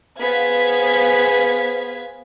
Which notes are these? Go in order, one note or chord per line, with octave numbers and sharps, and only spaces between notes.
B3 G#4 C5 F5 G#6 B6